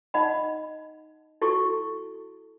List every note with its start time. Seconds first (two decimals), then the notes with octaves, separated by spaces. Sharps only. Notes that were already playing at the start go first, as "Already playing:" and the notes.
0.14 D#4 D#5 F#5 B5
1.42 E4 F#4 A4 C#6